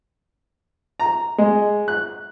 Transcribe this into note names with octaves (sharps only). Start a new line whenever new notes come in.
A#5
G#3
F#6